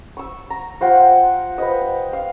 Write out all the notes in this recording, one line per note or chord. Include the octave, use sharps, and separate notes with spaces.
C#6 E6
A#5
F4 C5 F#5 G5
B4 C5 D#5
F5